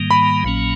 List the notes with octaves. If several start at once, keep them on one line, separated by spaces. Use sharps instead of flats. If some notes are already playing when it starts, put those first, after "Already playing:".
Already playing: G#2 D#3 G3 A#3
B5
A#1 A#2 F#3 A#3 C#4